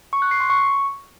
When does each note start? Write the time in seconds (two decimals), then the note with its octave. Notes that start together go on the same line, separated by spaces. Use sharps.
0.13 C#6
0.22 F#6
0.31 C7
0.40 C6
0.50 C#6